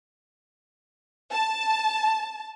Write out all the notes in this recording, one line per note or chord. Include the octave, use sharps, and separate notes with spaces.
A5